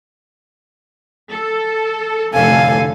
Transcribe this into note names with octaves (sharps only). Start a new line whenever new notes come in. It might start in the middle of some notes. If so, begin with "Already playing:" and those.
A4
F1 A2 D3 A4 F5 G#5